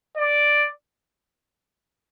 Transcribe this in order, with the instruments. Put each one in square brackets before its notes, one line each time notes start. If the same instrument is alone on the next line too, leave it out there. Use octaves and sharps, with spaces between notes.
[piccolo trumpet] D5